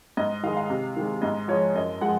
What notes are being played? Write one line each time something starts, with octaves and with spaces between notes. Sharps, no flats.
G#2 D#5
D#3 G#3 F5
F5
C3
D#3 G#3
G#2 D#5
F3 G#3 C#5
F#2 D#5
F3 G#3 F#5